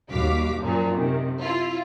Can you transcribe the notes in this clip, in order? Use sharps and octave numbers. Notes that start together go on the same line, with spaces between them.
D#2 G3 F#4 F5 D6 B6
F#2 A#2 F3 F#3
C3 D#3
E4 F4